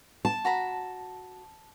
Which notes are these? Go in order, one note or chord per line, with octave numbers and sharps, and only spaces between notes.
A5
F#4 A#5 B5